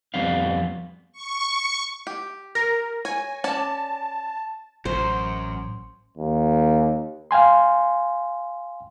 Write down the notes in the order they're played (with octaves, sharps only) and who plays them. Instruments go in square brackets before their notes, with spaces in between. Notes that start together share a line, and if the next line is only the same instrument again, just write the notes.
[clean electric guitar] F2 G3 B3 F5
[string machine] C#6
[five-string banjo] G4
[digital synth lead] A#4 [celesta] A#6
[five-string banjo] C#5 [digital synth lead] G#5
[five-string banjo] C#4 D5 [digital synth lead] A5
[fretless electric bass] A1 [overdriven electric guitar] F#2 [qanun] C5
[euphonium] D#2
[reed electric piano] F5 G5 G#5 C6